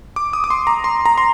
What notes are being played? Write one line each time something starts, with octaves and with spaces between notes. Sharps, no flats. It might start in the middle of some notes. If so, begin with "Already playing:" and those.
D6
D#6
D6
C6
A#5
C6
A#5
C6